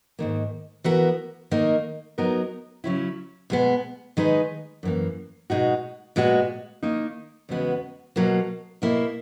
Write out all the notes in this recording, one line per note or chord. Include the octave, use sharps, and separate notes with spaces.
G#2 D#3 A#3
E3 B3 F#4 A#4
D#3 A#3 D#4 A#4
F#3 B3 D#4 A#4
C#3 F#3 C#4 E4
B2 G#3 B3
D#3 G#3 D#4 G#4 B4
F#2 E3 A#3
B2 G#3 D#4 F#4
A#2 G#3 B3 F#4
D#3 A#3 D#4
E2 C#3 G#3 B3 F#4
B2 F#3 A#3
B2 A#3 E4